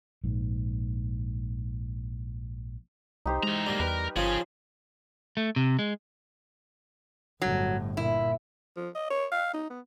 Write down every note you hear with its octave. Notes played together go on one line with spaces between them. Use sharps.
A#1 G#2
C2 D#4 G4 C5
E3 G#3 A#5
D2 G3 A#3
E2 A#4 B4
G1 F3 C#4 G#4 C#5
A3
C3
G#3
G1 A2 F#3
A#2 E4
F3
D#5
C#5
F5
D#4
B3